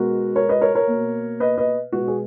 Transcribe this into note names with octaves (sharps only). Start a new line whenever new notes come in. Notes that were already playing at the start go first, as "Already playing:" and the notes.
Already playing: B2 G#3 B3 F#4 A#4
A#4 C#5
B4 D#5
A#4 C#5
A#4 C#5
A#3
B2
B4 D#5
B4 D#5
B2 G#3 B3 F#4
G#4